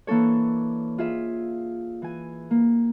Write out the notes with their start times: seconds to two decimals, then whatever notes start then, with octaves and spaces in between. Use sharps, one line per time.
0.07 E3 A#3 D4 A4 C#5
0.98 F4 G#4 E5
2.02 E3 G#5
2.51 A#3